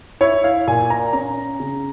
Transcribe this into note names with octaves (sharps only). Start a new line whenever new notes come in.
E4 C#5
F5
A#2 G#5
A#5
C#4 A#5
C#3